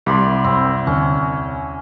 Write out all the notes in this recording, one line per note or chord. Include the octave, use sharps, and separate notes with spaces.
C2 D5 B5 C6
F#2 C4
D#2 D3 C#4